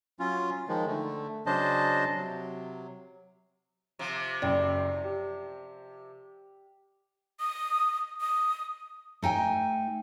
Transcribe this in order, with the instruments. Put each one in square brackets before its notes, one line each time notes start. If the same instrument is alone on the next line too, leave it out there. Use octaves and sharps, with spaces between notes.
[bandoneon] F#3 C#4 F4
D#3 F3 G#3
D3 A3
C#3 F#3 D4 C5 D#5 A5
C3 F#3
[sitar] C3 F3
[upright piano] F#1 F#2 [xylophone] D5 G5
[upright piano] G4
[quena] D#6
D#6
[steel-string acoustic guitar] A3 D#4 G5 G#5